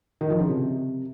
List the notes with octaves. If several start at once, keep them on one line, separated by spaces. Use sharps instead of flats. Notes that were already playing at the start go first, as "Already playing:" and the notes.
D#3
F3
C#3
C3